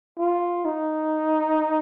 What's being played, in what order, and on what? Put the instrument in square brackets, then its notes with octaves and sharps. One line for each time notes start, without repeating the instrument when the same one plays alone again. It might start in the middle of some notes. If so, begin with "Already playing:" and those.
[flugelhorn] F4
D#4